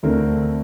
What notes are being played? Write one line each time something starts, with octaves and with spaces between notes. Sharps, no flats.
D2 D3 A3 C4 A#4